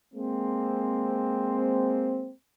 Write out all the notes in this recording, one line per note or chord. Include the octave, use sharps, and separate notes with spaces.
G#3 A#3 C4